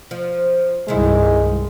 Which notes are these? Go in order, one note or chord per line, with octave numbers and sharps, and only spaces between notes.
F3
C2 G2 D#3 G#3 E4